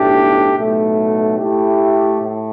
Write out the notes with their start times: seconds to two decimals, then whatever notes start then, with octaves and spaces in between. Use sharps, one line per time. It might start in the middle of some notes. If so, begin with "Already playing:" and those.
Already playing: B1 A2 A3 D4 G4
0.55 B1 A2 A3
1.38 A2 A3 E4 G4
2.22 A2